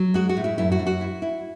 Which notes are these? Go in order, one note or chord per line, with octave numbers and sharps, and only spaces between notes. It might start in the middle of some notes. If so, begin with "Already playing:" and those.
Already playing: F#3
G#3 F#4
F#4
A2
E4
F#2 E4
F#4
F#2
F#4
E4
E4